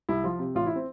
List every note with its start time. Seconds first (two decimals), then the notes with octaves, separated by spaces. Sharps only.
0.09 C2 E4
0.24 F3 F4
0.39 C3
0.55 A1 F4
0.66 E4
0.76 C4